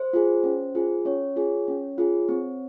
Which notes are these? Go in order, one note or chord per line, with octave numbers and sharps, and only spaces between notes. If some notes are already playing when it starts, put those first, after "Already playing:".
Already playing: C5
F4 G#4
C#4
F4 G#4
C#4 C#5
F4 G#4
C#4
F4 G#4
C4